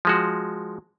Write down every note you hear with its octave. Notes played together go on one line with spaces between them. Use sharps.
F3 G#3 F#4